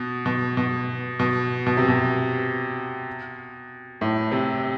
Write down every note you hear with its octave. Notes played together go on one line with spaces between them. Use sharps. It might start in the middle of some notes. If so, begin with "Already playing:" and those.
Already playing: B2
B2
B2
B2
B2
C3
B2
A2
C3